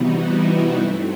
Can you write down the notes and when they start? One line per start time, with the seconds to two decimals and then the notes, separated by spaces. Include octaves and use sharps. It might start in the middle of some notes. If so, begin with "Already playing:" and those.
Already playing: C3 E3 G3 B3 D#4 F#4
0.15 E4
0.45 E4
0.75 G2 F#3 A3 C4 E4